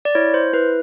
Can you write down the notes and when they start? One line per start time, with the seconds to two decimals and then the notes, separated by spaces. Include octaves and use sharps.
0.05 D5
0.15 E4 C#5
0.34 C5
0.53 E4 B4